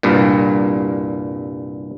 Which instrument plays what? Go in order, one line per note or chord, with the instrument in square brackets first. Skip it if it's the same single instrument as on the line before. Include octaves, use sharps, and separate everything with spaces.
[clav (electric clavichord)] C2 G2 A#2